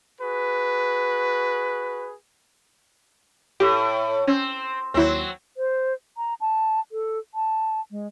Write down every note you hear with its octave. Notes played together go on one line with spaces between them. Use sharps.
F#4 G#4 B4
A2 G4
C4 C#4
D#2 F#3 C4 E4
C5
A#5
A5
A4
A5
G#3